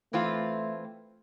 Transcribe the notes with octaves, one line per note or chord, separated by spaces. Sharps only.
E3 A3 C4 F4